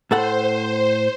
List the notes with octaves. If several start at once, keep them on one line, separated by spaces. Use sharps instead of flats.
A2 A4 C5 F#5